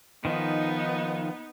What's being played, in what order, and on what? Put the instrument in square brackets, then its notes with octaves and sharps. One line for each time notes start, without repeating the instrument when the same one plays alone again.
[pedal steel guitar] D#3 F3 [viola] B3 D#4